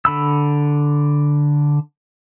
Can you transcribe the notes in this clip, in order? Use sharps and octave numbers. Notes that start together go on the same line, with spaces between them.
D3 B5 E6